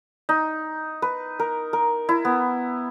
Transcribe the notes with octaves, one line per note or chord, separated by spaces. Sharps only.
D#4
B4
A#4
A#4
E4
B3